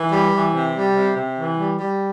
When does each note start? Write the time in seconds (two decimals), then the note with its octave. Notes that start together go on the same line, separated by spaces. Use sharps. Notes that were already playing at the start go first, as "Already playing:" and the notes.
Already playing: E3
0.11 G3
0.32 E3
0.54 C3
0.75 G3
0.95 C3
1.16 C3
1.37 E3
1.57 G3
1.79 G3